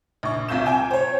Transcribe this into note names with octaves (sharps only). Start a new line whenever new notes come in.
A#1 C#6
C2 C3 F4 G6 E7
G5 G#5 E7
C5 C#5